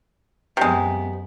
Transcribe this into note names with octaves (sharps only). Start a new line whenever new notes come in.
F#2 C3 G#3 B3